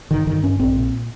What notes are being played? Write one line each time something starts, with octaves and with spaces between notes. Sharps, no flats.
G1 D#3
G1 D#3
G2 C#4
A#1 C4
A#2